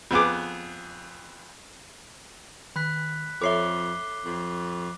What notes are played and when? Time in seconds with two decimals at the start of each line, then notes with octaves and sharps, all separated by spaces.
0.11 F2 B3 G#4 D6
2.76 D#3 B5 F#6 B6
3.41 F2 A4 C#5 E5 D6 C7 G7
4.25 F2